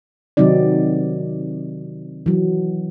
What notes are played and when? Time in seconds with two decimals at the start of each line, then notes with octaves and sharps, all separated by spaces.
0.37 C3 D#3 F#3 C4 D#4 D5
2.26 E3 F#3